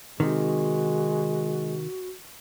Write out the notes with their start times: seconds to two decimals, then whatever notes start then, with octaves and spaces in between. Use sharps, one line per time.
0.20 C3 D#3 G#3 F#4